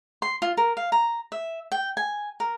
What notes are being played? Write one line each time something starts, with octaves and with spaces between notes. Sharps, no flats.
C6
F4
A#4
F5
A#5
E5
G5
G#5
A#4